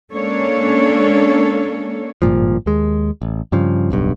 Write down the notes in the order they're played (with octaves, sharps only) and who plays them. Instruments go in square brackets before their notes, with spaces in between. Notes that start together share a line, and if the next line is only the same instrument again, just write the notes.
[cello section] G#3 A#3 C#4 D4 A4 C#5
[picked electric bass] G#1 G2 A#2 F3
D#2 G#3
A1
G2 C#3 F3
D1 B1 G2